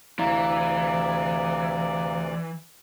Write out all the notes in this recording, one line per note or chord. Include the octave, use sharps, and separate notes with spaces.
D2 C3 E3 D5 F5 A#5